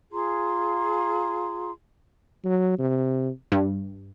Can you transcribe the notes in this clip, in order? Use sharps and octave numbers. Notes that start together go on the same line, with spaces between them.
F4 G#4 A#5 C6
F#3
C3
G2